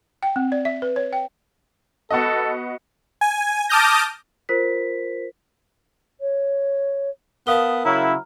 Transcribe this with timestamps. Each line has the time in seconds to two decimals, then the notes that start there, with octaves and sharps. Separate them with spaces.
0.23 G5
0.36 C4
0.52 D5
0.65 E5
0.82 B4
0.96 C#5
1.13 G5
2.11 B3 F#4 A4 D#5
3.21 G#5
3.69 A5 D6 D#6 F6 G6 A#6
4.49 F4 A#4 C5 B6
6.20 C#5
7.47 B3 A#4 F5 A5 D#6 G7
7.85 C#3 F#3 E4 A#5 F6